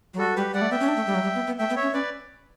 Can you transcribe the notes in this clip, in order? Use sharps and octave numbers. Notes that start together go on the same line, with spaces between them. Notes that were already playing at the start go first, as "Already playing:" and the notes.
F#3
G3 F#4 A4
G3 G4 B4
G3 D5 F#5
A3
B3 E5 G5
C#4
D4
A3
G3
F#3
G3
B3
B3
A3 E5 G5
B3
C#5 E5
C#4
C#4 B4 D5